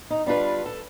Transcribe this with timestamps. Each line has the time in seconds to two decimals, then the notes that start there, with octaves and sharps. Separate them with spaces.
0.10 D#4
0.26 G3 D4 F4 B4
0.66 A4